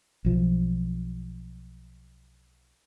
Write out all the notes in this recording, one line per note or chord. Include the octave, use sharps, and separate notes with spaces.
B1 F3